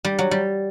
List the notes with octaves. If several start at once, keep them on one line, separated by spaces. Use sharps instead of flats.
G3
F#3
G3